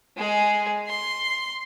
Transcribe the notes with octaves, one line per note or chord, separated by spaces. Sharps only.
G#3 G#4
C6